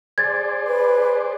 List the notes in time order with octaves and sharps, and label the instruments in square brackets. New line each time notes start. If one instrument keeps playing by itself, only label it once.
[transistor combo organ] G#4 C5 D5 [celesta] G#6 A6
[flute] B4